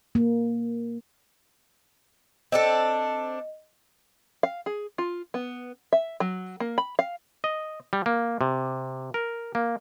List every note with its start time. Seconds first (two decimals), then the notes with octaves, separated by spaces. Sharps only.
0.15 A#3
2.52 C4 D4 A4 D#5
4.43 F5
4.66 G#4
4.98 F4
5.34 B3
5.93 E5
6.20 F#3
6.60 A#3
6.78 B5
6.99 F5
7.44 D#5
7.93 G3
8.06 A#3
8.41 C3
9.14 A#4
9.55 A#3